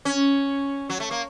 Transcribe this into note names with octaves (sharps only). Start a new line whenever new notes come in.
C#4
F#3
A3
A#3